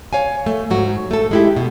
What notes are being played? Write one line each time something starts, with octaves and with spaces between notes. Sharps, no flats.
C#5 F5 G#5
A3
G#2 F#3 F#4
A3 A4
G#3 E4 G4
B2